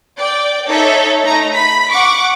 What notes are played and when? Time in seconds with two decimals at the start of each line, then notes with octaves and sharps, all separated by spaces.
0.17 D5 G5
0.66 D#4 A4 C#5 E5
1.24 A3 D#4 A#5
1.55 B5 B6
1.90 F#5 C#6 D6